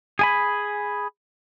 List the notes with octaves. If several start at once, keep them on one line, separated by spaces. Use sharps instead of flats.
G#4 G#5 B5